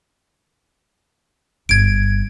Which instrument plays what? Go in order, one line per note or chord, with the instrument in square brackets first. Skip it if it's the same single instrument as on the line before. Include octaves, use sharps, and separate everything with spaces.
[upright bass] G1 [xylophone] G#6 D7